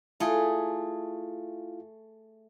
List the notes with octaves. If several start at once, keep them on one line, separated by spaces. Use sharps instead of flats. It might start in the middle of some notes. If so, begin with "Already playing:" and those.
A3 E4 F4 G#4 F5